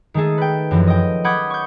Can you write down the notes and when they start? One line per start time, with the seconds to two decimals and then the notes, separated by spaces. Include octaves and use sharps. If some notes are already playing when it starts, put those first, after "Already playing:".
0.14 D#3 G#3 A3 G#4 A4
0.38 B4 G5
0.71 F#2 E3 F3
0.87 D#5 G5
1.24 F#5 B5 D6 D#6 G6 G#6
1.50 C#6 G6